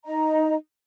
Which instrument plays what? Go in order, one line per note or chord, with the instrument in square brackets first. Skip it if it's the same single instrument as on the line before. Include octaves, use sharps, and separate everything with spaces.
[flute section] D#4 D#5 A#5